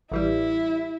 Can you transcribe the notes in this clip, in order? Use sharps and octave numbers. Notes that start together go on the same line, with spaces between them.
A1 E3 G3 E4